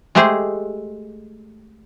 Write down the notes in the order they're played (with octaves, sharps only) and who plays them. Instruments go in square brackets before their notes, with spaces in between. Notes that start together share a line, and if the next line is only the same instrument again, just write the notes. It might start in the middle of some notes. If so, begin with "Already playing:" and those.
[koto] G#3 A3 G4 G#4 C5